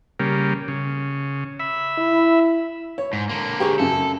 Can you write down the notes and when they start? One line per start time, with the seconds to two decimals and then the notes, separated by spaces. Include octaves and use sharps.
0.20 C#3 G3 A#3
0.68 C#3
1.60 E5 B5
1.98 E4
2.98 C#5
3.13 G#2
3.29 D3 A#3
3.60 G4 G#4 C#6
3.79 F#2 C#3 F#3 A4